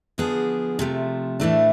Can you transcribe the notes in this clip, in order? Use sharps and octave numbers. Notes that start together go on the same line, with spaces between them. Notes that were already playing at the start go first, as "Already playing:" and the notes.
D3 F3 B3 D4 G#4
C3 F3 A3
A2 E3 A3 D4